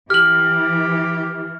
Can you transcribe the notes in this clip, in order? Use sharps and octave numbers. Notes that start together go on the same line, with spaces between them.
E3 G4 F6 F#7